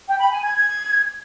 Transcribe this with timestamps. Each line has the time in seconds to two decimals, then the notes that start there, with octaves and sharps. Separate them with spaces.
0.07 G5
0.19 B5
0.31 G#5
0.42 G#6
0.54 G#6